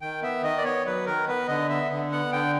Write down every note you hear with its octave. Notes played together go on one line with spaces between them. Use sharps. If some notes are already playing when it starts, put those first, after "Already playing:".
D#3 G5
B3 E5
D#3 D#5
D5
B3 C#5
F#3 B4
D#3 A#4
B3 B4
D3 D#5
B3 E5
D3
B3 F#5
D3 G5